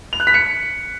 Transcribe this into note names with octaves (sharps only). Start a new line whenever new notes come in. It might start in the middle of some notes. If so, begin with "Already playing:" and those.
F7
F#6
B6
C#7